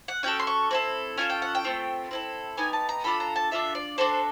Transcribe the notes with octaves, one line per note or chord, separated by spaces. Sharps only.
F#5
C#4 F#4 A4 G5
C6
C#6
C4 E4 A4
C#4 F4 A4 G#5
G5
F#5
G5
A3 C4 F4
C4 E4 A4
B3 D#4 G4 G#5
A5
A#5
D4 F4 A4 B5
A#5
A5
D4 F4 A4 E5
D5
D4 F#4 A4 C5